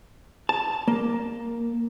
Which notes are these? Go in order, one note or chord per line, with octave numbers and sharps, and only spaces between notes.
A5
A#3